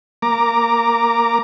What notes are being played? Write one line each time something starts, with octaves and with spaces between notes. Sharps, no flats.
A#3 A#5 D6